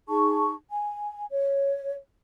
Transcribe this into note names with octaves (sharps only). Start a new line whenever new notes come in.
D#4 G#4 A5 C#6
G#5
C#5